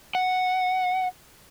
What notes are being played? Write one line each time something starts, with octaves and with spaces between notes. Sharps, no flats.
F#5